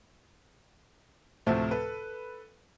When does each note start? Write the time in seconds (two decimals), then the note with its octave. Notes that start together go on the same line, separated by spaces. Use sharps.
1.47 D2 A2 C3 F3 A3
1.71 A4 B4